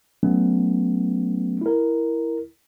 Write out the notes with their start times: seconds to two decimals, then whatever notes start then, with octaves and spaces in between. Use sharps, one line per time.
0.23 F#3 A3 B3 C#4
1.61 E4 A#4